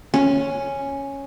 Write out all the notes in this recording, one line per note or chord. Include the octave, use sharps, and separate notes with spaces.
C#4